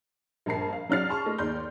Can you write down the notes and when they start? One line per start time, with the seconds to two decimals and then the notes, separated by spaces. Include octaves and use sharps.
0.46 A#1 G2 A#4 A5 C7
0.73 F5
0.89 F#3 C#4 D4 F6 A6 C7
1.09 A5 C6 C#6
1.25 A3 D#5
1.38 D#2 D5 C6 G6